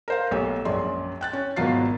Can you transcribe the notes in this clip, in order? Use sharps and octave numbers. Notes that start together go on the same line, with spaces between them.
A#4 C5 F5
B1 A3 G4 A4 C#5
A#1 F#2 G#3 C#4 D5 C6
G5 F#6 A6
C#4
G#1 B2 F#3 F4 A6 C7